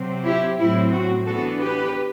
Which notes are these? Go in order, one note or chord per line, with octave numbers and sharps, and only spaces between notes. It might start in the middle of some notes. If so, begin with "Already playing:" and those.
Already playing: C3 F#3 C4
E4 G4
A2 F#3 C4 E4
F#4
E3 B3 D4 F#4 A4
G4 B4